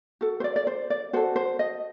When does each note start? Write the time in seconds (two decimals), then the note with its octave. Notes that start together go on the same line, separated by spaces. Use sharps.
0.21 F#4 A4
0.40 C5
0.44 D5
0.56 D5
0.67 C5
0.90 D5
1.13 F#4 A4 C5
1.36 C5
1.59 D#5